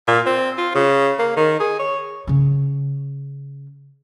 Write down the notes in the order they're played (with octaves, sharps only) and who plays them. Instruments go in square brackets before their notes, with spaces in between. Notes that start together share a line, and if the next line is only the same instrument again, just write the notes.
[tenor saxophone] A#2
C4
F4
C#3
A#3
D#3
G#4
C#5
[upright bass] C#3 C#4